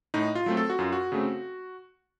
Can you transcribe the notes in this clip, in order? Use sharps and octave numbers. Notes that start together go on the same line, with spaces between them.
A2 D#4
F4
F#3 A3 C4
A4
F#4
F#2 F4
F#4
C#3 A3 C4